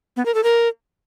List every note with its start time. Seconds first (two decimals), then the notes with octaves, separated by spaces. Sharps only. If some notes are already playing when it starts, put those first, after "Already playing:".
0.17 B3
0.26 A#4
0.35 A4
0.43 A#4